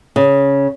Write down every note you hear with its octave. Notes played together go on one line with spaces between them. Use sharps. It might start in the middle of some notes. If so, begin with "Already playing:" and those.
C#3